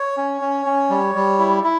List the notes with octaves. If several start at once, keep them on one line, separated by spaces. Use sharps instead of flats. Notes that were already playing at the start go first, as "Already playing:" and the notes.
Already playing: C#5
C#4
C#4
C#4
G3
G3
E4
E4